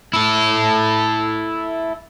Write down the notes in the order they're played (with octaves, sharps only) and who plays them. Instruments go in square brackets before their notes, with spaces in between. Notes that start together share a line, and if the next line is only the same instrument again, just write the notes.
[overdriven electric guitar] E4 A4